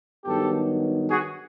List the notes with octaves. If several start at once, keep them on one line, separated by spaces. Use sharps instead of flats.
G2 D#3 F#3 B3 G4 A4
F#4 G#4